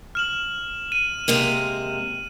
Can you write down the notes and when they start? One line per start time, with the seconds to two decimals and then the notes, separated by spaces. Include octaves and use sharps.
0.15 F6 E7 F#7
0.92 D#7
1.28 C3 G#3 A#3